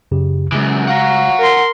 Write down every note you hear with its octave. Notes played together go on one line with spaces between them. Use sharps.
F#2 C#3 G4
F#2 C#3 E3 G#3
F#4 F5 F#5 A#5
A#4 C6